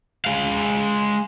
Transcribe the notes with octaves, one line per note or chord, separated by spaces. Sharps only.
G#3 F5